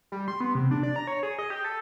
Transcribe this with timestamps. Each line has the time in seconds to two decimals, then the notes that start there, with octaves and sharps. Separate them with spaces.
0.12 G3
0.28 C6
0.41 B3
0.55 C3
0.71 D4
0.83 D5
0.96 A#5
1.07 C#5
1.23 G#4
1.39 D#5
1.50 G4
1.64 A4